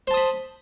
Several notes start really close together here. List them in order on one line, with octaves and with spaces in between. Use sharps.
C5 A5 D#6 B5